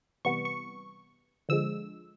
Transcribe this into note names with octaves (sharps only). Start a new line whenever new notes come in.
C3 E3 G3 B3 C#6
C#6
D3 F3 G#3 E6